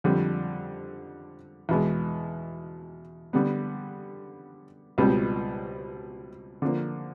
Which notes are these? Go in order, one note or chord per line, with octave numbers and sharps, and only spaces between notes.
F2 D3 G3 C4
E2 B2 G#3
D3 G3 B3
C#2 B2 G3 C4
D3 F3 A#3